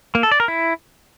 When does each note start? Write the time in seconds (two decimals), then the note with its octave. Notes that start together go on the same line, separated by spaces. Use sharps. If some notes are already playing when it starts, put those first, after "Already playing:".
0.15 A#3
0.23 A4
0.31 D5
0.40 A#4
0.48 E4